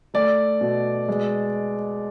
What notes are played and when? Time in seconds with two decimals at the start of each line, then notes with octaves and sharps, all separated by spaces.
0.14 A3 D5
0.61 B2
1.08 G#3